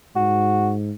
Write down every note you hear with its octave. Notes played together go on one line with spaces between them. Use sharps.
G#2 F#4